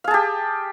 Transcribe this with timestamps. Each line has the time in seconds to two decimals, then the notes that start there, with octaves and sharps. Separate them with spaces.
0.04 F5
0.08 G#4
0.11 A5
0.14 G4